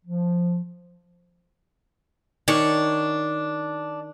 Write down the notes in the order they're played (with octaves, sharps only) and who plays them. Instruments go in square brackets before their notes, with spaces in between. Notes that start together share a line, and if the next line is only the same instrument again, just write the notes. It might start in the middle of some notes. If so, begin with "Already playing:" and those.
[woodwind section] F3
[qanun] D#3 C#5 C#6 [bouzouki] D4